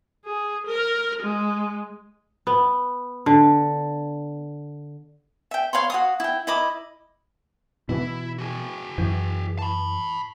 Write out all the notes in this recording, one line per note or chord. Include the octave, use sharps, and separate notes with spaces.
G#4
A#4
G#3
B3
D3
E5 G5
C#5 F5 B5 C6
F#4 F5 D#6
E4 G5
E4 D#5 B5 D6
B2 E3 B3 E4
F#4 G#4
F#2 E3
A5 B5